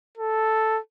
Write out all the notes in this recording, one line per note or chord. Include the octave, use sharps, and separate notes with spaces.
A4